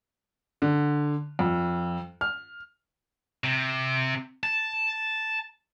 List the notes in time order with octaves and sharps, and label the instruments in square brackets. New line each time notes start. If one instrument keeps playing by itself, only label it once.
[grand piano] D3
F2
F6
[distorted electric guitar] C3
A5